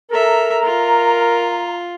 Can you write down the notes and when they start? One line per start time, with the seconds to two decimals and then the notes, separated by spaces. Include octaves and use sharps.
0.11 A4 A#4 E5 A#5
0.64 F4